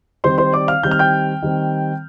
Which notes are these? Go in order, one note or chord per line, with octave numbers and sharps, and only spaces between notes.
D#3 G3 C4 C5 C6
C5 C6
D5 D6
F5 F6
D#3 G3 C4 G6
F6
G5 G6
D#3 G3 C4